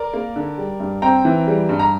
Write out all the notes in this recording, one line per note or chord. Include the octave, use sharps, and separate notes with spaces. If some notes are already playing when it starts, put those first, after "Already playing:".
Already playing: A#4 D5
A#3
D3
G3
G2
C4 G5 A#5
E3
G3
G2
A#5